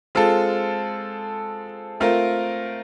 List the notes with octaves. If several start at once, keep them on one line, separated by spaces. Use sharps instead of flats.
G#3 C4 F4 A4
A3 C4 F4 A#4